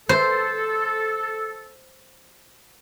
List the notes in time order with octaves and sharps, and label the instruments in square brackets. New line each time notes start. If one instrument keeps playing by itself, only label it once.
[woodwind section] A4 [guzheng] C5